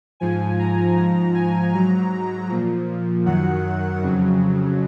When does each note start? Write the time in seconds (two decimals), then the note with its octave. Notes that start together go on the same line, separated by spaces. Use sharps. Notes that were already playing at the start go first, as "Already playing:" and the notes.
0.20 G#2 F3 G#5
0.59 A#5
0.96 G#2 F3 A#5
1.35 G#5
1.73 G#2 F#3 A#5
2.49 A#2 F3
3.25 F#2 D#3 F#3 F#5
4.02 F2 C#3 F#3